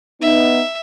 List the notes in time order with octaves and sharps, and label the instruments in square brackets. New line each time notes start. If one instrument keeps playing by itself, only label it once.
[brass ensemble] B3 D#4 [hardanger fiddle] E5